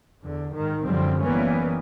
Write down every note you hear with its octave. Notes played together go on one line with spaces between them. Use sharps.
E2 D3
G#2 D#3
F#2 D3 F3 G3 C4
F#1 E3 G3 A#3 B3 C#4